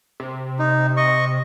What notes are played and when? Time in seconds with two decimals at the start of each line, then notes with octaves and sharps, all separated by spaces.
0.20 C3
0.59 D#4
0.97 D#5 C#6